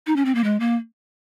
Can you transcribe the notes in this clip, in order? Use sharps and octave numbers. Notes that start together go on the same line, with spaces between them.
D#4
C#4
C4
A#3
G#3
A#3